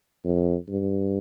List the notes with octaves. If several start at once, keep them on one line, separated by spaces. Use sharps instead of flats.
F2
G2